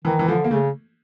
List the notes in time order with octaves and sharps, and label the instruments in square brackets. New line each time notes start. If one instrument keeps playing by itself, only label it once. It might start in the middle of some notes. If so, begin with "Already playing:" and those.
[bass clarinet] D#3 [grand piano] E3
[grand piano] E3
[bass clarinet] D3 [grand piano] F3
[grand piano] A#3
[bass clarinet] C#3 [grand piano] A3